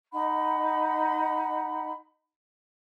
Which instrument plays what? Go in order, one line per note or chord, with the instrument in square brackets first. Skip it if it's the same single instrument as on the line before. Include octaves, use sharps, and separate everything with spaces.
[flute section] D#4 D#5 F#5 B5